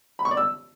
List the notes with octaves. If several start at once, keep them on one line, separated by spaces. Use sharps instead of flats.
B5
C#6
D5
E6